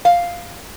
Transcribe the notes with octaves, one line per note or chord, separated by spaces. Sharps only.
F5